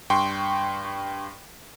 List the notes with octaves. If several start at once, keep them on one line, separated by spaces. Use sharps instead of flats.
G2 G5 C6 C#6